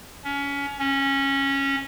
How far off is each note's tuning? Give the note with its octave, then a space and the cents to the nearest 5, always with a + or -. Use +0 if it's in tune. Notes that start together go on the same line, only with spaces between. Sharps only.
C#4 +25
C#4 -15